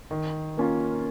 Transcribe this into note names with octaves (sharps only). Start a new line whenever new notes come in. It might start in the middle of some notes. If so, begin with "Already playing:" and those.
D#3
A#3 C#4 F4